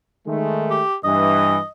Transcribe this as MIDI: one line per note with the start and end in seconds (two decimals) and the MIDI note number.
0.27 0.81 51
0.27 0.81 56
0.27 0.81 57
0.71 0.96 67
1.04 1.58 43
1.04 1.58 52
1.04 1.69 75